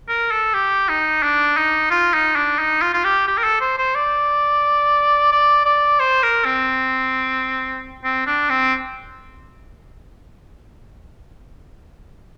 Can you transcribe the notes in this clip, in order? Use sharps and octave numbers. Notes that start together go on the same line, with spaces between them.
A#4
A4
G4
D#4
D4
D#4
F4
D#4
D4
D#4
F4
F4
G4
G4
A#4
A4
C5
C5
D5
D5
D5
C5
A#4
C4
C4
D4
C4